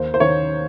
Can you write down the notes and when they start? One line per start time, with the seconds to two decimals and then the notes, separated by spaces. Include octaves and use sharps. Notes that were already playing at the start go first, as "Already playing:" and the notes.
Already playing: D#2 C5
0.14 C5
0.20 D#3 C#5